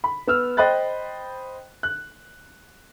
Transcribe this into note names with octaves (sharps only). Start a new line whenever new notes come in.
B5
B3 E6 F6
C5 D#5 G5 B5 F#6 A6
F#6